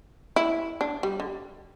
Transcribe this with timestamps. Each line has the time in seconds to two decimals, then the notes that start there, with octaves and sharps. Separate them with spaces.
0.36 E4
0.81 D4
1.03 G3
1.20 D3